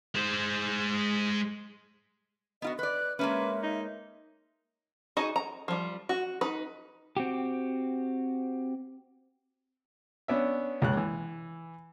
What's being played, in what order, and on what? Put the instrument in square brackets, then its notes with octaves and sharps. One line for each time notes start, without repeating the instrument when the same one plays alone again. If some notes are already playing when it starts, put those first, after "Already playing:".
[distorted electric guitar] G#3 C5
[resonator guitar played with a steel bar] B3 F4 F#4 [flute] D#5
[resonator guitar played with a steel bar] B4 D5 [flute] F#6
[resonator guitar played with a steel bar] G#3 A#3 C#4 [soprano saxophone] B4 [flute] E5
[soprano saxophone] D#4
[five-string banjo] D#4 F#4 G#4 D#5
A#5
F3 G3
F#4
D#4 B4
[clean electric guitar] C4 F#4 G4
[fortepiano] B3 C#4 D4 E5
C#2 C#3 F#6
E3